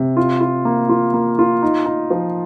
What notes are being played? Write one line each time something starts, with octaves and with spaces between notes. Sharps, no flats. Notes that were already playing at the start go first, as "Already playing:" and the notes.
Already playing: C3
F4
F4
A#3
F4
A#3
F4
D#4
D#4
F3